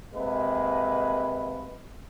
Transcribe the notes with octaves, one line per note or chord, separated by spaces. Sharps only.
C3 G#3 A#3 B4